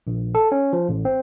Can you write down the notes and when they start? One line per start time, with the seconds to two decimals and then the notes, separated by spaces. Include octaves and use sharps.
0.07 A#1
0.35 A4
0.52 C#4
0.73 F3
0.89 A1
1.05 C4